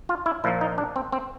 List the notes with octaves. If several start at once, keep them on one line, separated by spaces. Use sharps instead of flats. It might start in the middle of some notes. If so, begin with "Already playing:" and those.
F4
E4
A#2 F3 A#3 E4
D#4
D4
C4
C4